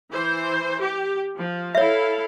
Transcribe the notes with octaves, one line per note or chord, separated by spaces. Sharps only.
E3 C5
G4
F3
E4 A4 C#5 E5 F5